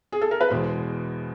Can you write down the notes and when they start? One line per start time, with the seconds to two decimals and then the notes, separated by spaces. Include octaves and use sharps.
0.12 G#4
0.21 A4
0.31 A#4
0.41 B4
0.50 E2 B2 G#3 C5